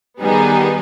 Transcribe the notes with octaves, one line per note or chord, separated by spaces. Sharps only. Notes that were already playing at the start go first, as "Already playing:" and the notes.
D#3 G3 B3 D#4 G#4